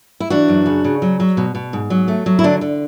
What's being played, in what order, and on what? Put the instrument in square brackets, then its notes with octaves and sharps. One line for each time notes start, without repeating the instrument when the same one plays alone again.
[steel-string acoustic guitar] E4
E3 D4 F#4
F#2
C#3
C#3
F#3
F#3
B2
B2
G#2
F#3
A3
F#3
E4
D3 D4
D3